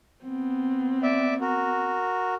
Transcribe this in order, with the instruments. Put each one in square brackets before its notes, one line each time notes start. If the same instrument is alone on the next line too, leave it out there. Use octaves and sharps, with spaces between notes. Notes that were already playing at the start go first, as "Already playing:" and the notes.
[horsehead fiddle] B3 C4
[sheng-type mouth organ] D5 E5
F#4 A#4